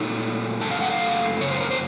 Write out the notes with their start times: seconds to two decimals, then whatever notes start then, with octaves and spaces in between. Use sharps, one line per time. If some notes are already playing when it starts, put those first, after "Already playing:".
Already playing: A#2 F#3 A3 D#4
0.61 F#2 C#3 A3 A5
0.71 F5
0.81 F#5
0.91 F5
1.41 F#2 C#3 C#5
1.51 C5
1.61 A#4
1.70 C5